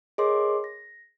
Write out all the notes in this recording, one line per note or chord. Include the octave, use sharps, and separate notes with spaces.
G#4 A#4 C#5 D#5 C6 D6
A#6